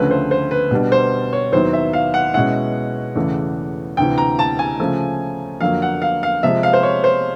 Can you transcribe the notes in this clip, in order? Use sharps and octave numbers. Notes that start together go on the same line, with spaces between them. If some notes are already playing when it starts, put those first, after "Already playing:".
Already playing: D2 C#3 F3 A3 C#4 B4
C5
C5
B4
B2 G3 B3 D4
C5
C#5
D#2 D#3 F#3 B3 E4 C5
E5
F5
F#5
B2 G#3 C#4 E4 F#5
E2 C#3 E3 A3
D2 C3 E3 G5
A#5
A5
G#5
C#3 F3 A3
F2 D3 F#3 A#3 F5
F#5
F5
F5
C3 F3 G#3 E5
F5
C5
C#5
C5